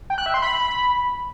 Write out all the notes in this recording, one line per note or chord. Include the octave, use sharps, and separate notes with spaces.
G5
F#6
E5
C6
B5